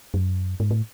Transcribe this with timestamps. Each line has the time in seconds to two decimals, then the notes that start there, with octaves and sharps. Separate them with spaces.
0.14 F#2
0.60 G#2
0.71 A2